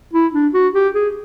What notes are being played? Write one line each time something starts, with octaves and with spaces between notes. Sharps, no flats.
E4
D4
F#4
G4
G#4